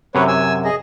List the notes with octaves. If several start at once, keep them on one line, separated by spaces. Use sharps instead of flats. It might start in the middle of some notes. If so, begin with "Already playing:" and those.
F#2 C3 B4 C#5
G#5 E6
G#4 D#5